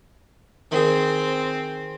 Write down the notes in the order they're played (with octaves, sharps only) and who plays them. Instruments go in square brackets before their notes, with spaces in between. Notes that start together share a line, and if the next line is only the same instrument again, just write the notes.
[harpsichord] D#3 G#4 [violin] C4